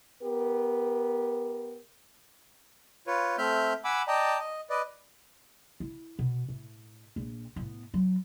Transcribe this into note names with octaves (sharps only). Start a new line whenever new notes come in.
B3 G4 A#4
F4 B4 C#5
A3 C4 E5 F6 G6
F#5 G#5 B5 D6 E6
D5 D#5 G5 A5 A#5
D#5
B4 D5 D#5
E4
B2
A2
A#1
A2 B3
F#3